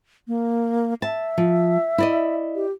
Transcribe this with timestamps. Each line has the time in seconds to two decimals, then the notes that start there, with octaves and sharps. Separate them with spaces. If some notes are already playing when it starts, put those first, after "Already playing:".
0.28 A#3
1.02 E5 A5
1.38 F3
1.98 E4 D5 D#5
2.55 G4